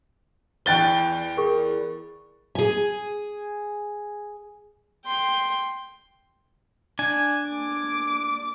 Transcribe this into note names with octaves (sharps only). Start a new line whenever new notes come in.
E2 A2 B4 G5 A6 G7
G#4 A#4 C#6
G#4 G#5
G5 C6
D4 G#5
D6